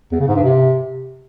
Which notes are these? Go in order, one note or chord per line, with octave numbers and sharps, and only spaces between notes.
E2
C#3
G#2
G2
C3